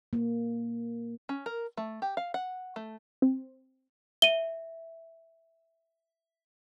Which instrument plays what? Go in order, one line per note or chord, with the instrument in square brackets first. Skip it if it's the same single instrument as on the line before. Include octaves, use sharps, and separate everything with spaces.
[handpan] A#3
[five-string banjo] C#4
A#4
A3
G4
F5
F#5
A3
[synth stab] C4
[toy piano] E5 [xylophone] D#7 G7